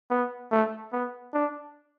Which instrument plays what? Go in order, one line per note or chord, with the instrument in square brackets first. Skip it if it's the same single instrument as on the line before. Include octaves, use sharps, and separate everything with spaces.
[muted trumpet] B3
A3
B3
D4